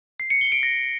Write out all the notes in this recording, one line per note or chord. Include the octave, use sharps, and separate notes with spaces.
C7
C#7
G7
D7
A#6